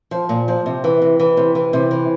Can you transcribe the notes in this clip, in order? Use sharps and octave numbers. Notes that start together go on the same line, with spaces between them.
F3
A#2
F3
C3
E3
C3
E3
C3
E3
C3
E3